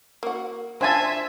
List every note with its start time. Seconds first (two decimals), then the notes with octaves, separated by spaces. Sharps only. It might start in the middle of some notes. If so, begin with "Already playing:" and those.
0.23 A#3 F#4
0.81 D4 F4 C5 E5 G#5 A5